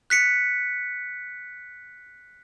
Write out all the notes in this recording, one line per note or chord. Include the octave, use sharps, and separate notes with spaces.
F#6 B6 C#7